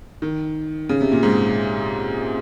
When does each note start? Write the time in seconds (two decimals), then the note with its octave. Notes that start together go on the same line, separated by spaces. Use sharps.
0.22 D#3
0.89 C#3
1.01 C3
1.12 A#2
1.23 G#2